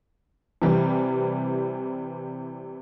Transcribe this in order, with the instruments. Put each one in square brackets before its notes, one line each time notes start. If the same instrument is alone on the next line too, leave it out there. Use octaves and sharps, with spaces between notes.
[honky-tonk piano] C3 E3 G3